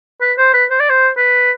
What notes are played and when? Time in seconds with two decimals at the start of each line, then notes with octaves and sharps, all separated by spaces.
0.22 B4
0.38 C5
0.54 B4
0.71 C5
0.80 D5
0.90 C5
1.17 B4